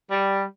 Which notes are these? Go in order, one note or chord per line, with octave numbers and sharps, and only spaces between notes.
G3